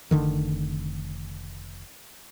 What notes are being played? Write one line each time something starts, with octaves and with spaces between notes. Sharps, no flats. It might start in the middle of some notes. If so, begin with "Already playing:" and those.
F1 D3 D#3